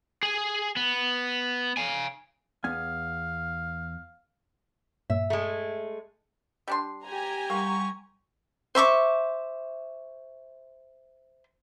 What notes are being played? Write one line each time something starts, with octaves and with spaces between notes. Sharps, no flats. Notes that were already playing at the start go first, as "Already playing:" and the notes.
G#4 G#5
B3
F5 G#5
E2 B3 F5 G#5
G2 A#2 A#3 E5
G#3 A3
G3 D4 C6
G4 G#5 A#5
G3 A#3 F#5 C6 C#6
C5 E5 C#6 D6